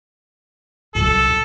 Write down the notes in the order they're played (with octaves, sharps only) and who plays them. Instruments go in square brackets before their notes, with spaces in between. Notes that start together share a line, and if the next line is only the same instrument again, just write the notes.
[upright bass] C2 F#2 [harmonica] A4